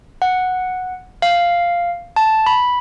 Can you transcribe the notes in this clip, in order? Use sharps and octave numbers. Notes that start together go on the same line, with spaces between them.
F#5
F5
A5
B5